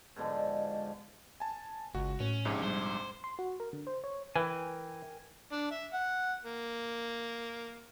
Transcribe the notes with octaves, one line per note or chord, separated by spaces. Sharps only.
G#2 B2 D3 F3
G#5 A5
G1 C#2 F#4
A2 C#4
A#1 G#2 C3
G3 C5
C6
F#4
A#4
D3
C5
C#5
E3 A#4 B4 G5 G#5
D4
E5
F#5
A#3